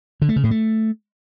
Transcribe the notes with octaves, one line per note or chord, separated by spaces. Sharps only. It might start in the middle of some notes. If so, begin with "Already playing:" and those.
D3
A3
C#3
A2
A3